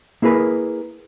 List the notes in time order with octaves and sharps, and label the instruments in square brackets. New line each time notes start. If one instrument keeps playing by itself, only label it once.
[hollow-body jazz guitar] A#3 E4 G#4 A#4 B4